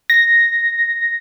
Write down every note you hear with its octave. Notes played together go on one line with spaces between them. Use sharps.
A#6